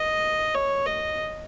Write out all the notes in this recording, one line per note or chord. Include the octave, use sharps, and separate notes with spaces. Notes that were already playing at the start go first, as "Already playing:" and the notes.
Already playing: D#5
C#5
D#5